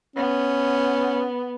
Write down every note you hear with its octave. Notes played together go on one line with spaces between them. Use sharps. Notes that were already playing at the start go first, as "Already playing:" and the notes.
B3 C#4